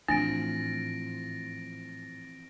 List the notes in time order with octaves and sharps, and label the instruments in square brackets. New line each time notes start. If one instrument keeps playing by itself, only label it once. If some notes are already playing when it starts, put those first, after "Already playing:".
[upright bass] A2 [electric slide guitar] E3 F3 C4 [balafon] D4 [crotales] A6 A#6 D7